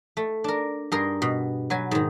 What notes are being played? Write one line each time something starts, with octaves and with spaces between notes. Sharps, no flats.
A3
D4 A#4
G2 G#4 A#4 A#5 C6
B2
F#3 B4 G#5
G#2 D#3